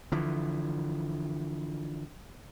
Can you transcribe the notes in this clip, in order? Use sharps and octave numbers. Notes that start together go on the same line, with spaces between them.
D3 E3 F3